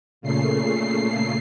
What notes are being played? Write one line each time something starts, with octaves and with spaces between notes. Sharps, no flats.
A#2 C#3 A3 C7